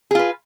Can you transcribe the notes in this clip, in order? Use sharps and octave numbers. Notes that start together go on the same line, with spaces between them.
F4 G#4 B4